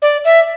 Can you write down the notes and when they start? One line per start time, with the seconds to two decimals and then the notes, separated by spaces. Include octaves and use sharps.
0.02 D5
0.24 E5